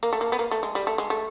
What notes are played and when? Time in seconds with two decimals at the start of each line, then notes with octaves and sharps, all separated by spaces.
0.03 A#3
0.13 A3
0.21 A#3
0.32 B3
0.39 A#3
0.51 A3
0.63 G#3
0.75 G3
0.87 A3
0.98 G#3
1.10 A3